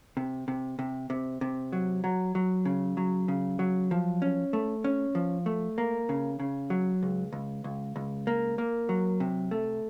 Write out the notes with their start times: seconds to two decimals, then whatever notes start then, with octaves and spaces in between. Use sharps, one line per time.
0.17 C3
0.48 C3
0.79 C3
1.10 C3
1.41 C3
1.73 F#3
2.04 F#3
2.35 F#3
2.65 C#3
2.97 F#3
3.28 C#3
3.59 F#3
3.91 F3
4.22 C#4
4.53 A3
4.84 C#4
5.15 F3
5.46 A3
5.78 A#3
6.09 C#3
6.40 C#3
6.70 F#3
7.03 C#2
7.33 C#2
7.64 C#2
7.96 C#2
8.27 A#3
8.58 A#3
8.89 F#3
9.20 C3
9.51 A3